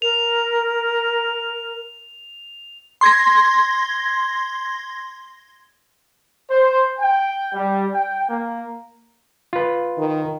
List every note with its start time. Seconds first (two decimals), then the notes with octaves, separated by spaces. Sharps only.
0.02 A#4 F7
3.01 C6 G#6 A#6
6.49 C5
6.99 G5
7.54 G3
7.94 G5
8.29 A#3
9.53 F4 B4
9.98 D#3